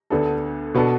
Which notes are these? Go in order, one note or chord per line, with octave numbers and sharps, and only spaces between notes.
D2 D3 B3 D4 A4
B2 B3 D4 A4